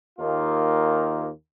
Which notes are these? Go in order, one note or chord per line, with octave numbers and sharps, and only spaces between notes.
D#2 D#3 A#3 F4